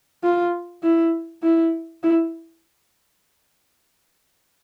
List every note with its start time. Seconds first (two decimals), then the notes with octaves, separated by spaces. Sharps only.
0.23 F4
0.83 E4
1.43 E4
2.03 E4